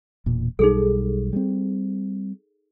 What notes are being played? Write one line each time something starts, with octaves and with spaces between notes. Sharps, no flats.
E1 A#2
B1 G3 D#4 G#4 A4
G3 G#3 C4